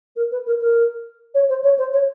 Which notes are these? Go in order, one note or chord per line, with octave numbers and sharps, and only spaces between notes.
A#4
B4
A#4
A#4
C#5
C5
C#5
C5
C#5